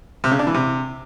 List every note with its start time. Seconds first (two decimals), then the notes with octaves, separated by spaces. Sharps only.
0.24 C3
0.31 C#3
0.39 D4
0.47 E3
0.54 C3